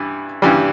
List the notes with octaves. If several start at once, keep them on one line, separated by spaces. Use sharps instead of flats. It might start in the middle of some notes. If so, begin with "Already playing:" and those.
Already playing: G2 E3
G2 E3 G3